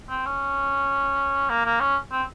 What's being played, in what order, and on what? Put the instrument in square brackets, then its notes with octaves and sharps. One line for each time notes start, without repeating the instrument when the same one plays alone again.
[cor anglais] C4
C#4
A#3
A#3
C#4
C4